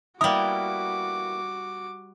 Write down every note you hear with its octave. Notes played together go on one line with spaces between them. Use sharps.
G3 A#3 B3 E4 F#4 A#4 D6 D#6